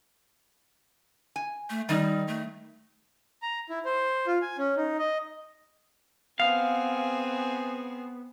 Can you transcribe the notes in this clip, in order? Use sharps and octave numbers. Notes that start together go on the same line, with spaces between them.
G#5
A3
D#3 G3 D#4
A3
A#5
E4
C5
F4
G#5
C#4
D#4
D#5
B3 C4 G#4 F5